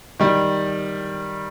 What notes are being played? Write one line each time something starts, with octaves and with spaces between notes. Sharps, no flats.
D#3 G3